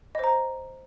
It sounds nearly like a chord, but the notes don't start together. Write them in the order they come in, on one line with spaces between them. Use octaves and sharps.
D#5 C5 A#5